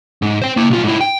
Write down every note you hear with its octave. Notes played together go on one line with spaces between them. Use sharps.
G#2
C5 G5
A#3 E4
B1 F4
G#2 E4
G5